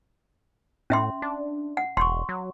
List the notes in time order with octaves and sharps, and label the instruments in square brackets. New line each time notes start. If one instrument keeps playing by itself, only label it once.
[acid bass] A2 [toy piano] C#4 E5 C6
[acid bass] D4
[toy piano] F#5
[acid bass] E1 [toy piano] C6 C#6
[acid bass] F#3